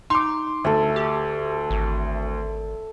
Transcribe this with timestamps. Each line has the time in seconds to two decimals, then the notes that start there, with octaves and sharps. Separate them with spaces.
0.10 D#4 C6 D6
0.64 D2 A4 E5
0.96 G4
1.71 G#1